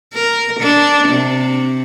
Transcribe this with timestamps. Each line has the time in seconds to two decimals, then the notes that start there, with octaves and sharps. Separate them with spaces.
0.14 A#4
0.60 D4
1.09 C3